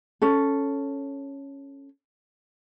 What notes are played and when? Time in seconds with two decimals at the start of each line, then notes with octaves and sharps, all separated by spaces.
0.22 C#4 A4